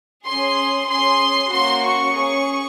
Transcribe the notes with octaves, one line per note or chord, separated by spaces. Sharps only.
C#4 G#4 C6
C#4 G#4 C6
A#3 C#4 F#4 C6
C#6
C#4 G#4